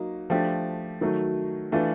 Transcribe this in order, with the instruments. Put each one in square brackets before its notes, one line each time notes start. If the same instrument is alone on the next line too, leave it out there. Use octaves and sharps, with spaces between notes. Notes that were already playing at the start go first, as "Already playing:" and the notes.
Already playing: [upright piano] F#3 A#3 D#4
F3 A3 D4 G4
D#3 F#3 A3
E3 A3 D4 F4